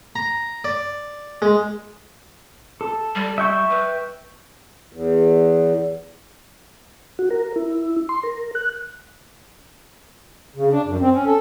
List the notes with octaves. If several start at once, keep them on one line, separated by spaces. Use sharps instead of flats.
A#5
D5
G#3
A4
G3
E5 G5 C#6
B4
E2
F#4
A#4
E4
C6
A#4
F#6
C#3
D4
F#2
C4
C#4
A4